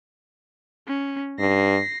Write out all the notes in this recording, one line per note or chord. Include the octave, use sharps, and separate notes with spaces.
C#4
G2 A#6 C7